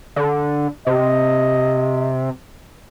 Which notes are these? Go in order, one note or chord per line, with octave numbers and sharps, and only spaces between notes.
D3
C3 D#5